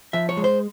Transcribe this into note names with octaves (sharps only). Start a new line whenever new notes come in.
F3 E5
C#5
G#3
C5